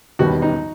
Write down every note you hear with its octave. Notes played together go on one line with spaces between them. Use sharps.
E1 D#2 D#3 G3 B3 F#4
D#4